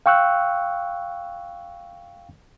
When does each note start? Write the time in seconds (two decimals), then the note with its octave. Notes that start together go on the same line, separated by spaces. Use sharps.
0.06 F5 G5 C#6 E6 F#6